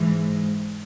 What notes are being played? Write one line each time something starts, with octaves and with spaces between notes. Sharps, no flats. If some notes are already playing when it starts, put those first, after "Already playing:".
Already playing: G#2 E3 G#3